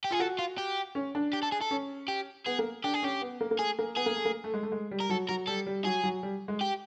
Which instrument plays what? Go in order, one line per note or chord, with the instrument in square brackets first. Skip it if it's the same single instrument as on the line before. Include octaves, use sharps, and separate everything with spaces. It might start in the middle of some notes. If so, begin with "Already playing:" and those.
[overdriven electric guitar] G4
[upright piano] F4 [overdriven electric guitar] G#4
[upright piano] F#4 [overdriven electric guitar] A4
[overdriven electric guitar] F4
G4
[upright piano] C#4
D4
[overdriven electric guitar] G4
A4
G#4
A4
[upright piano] C#4
[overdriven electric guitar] G4
[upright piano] B3 [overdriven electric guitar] G#4
[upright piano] A#3
[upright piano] D4 [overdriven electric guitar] G4
[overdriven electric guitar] G#4
[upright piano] C#4 [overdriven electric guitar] G4
[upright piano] B3
A#3
A#3
[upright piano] A3 [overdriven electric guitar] G#4
[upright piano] A#3
[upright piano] B3 [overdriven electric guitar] G#4
[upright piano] A#3
A3
A#3
A3
G#3
A3
G#3
G3
[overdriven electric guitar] A#4
[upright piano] F#3 [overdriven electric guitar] A4
[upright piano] F#3 [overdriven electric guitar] A#4
[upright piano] G3 [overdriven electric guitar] A4
[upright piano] G3
[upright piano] F#3 [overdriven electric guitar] G#4
[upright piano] F#3
G3
G#3
[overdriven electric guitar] G4